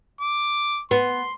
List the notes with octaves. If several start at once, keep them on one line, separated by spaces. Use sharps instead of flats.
D6
B3 C6